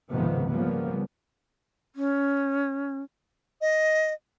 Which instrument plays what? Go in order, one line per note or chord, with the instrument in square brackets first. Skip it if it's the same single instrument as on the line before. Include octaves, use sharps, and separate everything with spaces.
[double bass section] C#2 G#2 C3 D#3 F3 B3
C#3 F3 G3 A#3 B3
[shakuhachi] C#4
[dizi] D#5